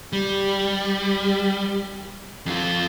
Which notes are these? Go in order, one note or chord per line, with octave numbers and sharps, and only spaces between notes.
G3
F2 F4